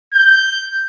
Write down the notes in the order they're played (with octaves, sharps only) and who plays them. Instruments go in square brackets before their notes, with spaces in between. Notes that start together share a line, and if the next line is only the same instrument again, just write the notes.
[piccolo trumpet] G6